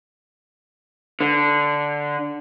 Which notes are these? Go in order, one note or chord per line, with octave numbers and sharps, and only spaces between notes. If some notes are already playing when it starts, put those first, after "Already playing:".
D3